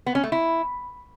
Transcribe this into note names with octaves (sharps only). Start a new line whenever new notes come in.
B3
C#4
A3
E4